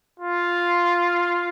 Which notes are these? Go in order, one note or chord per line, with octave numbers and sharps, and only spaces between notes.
F4